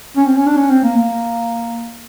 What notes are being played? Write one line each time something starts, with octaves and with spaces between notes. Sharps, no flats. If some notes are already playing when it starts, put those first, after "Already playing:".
C#4
C4
C#4
D4
C#4
C4
A#3
A#3